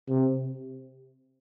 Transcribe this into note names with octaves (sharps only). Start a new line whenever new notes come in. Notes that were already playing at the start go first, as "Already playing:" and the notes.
C3